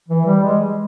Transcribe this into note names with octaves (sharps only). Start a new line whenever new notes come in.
E3
G3
G#3